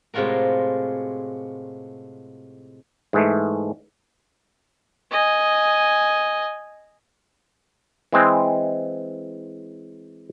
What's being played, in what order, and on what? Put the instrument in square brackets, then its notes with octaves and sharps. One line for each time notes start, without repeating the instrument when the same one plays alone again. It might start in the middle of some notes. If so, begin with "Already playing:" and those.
[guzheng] A2 C3 G#3 F4 F#4 A#4
[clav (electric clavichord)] G#2 E3 G#3 A3
[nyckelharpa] D#5 G#5
[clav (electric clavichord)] E3 G#3 C4